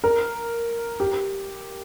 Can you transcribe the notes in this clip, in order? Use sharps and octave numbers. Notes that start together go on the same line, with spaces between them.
A#4
G4